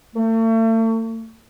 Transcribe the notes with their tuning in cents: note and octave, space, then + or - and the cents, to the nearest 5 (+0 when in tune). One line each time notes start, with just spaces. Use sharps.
A3 +40